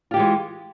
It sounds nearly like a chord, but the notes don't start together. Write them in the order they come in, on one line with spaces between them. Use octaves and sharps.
F4 G4 E3 G#3